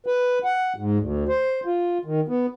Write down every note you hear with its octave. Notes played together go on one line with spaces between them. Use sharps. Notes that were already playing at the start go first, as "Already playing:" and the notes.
B4
F#5
G#2
D2
C5
F4
D#3
B3